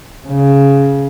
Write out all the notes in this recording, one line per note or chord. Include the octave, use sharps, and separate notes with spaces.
C#3